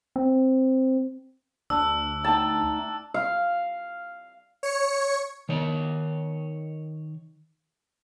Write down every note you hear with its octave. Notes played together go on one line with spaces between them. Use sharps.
C4
D2 D4 E6
A3 D#4 G5 A5
F5
C#5 C#7
D#3 C#5